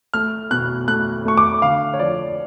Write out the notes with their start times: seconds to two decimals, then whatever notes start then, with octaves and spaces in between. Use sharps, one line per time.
0.14 A3 F6
0.51 B2 F#6
0.88 A3 F#6
1.25 A3 C#6
1.37 D6
1.62 D3 F5
1.94 C#5
1.99 F3 D5